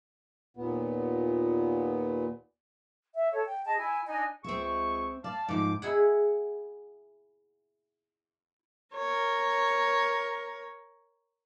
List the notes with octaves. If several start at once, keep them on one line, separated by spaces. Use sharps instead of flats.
D#2 A#2 B3
E5
A4 C#5
G5
G#4 D#5 A5
E4 G#5
D4 D#4 D#5 G#5
C#2 C4 G#4 E5 C#6
D5 F5 A5
G#2 F3 A3 D6
E4 G#4 F#5
A#4 C#5